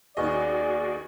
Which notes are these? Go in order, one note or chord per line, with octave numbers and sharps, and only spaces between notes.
D#2 B3 C#4 F#4 G#4 D5 D#5 G#5